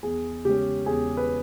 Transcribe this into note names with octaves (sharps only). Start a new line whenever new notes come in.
E2 G#4
C#3 G#3 C#4 G4
E2 G#4
B4